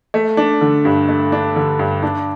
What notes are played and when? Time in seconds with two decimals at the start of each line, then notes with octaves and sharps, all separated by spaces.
0.14 A3
0.37 D4
0.61 D3
0.85 G2
1.09 A3
1.32 D4
1.56 D3
1.79 G2
2.03 D4